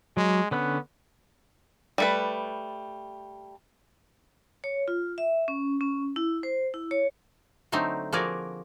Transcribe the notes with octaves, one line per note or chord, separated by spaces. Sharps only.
F#3 G#3
D3 B3 C#4 F#6
G3 A3 B4
C#5
F4
E5
C#4
C#4
E4
C5
E4
C#5
D3 F#3 A3 C4 D#4
F3 A#3 F#4 G#4 A#4 D5